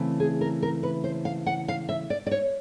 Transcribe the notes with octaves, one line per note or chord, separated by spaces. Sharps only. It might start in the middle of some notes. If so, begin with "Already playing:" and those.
Already playing: C#3 E3 A3 C4
G#4
A#4
A#4
B4
C5
F5
F#5
F5
E5
D5
D5
C#5